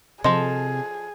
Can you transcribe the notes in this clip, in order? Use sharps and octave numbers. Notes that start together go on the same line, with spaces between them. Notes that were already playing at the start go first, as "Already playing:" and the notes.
C3 F3 G#4 A4 D#5 C6